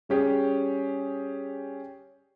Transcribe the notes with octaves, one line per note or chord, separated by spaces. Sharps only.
G3 C#4 G4 G#4